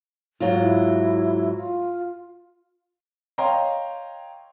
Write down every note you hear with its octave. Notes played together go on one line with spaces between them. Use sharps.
G#2 F#3 F4
E4
F4
C#5 D#5 F5 G5 A#5 C6